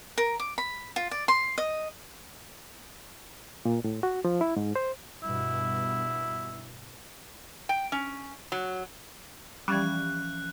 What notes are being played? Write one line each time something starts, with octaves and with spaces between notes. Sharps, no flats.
A#4
D6
B5
F4
D5
C6
D#5
A#2
A2
F#4
F3
E4
G#2
C5
G2 B2 E4
G5
C#4
F#3
E3 F3 G3 C#4 F#6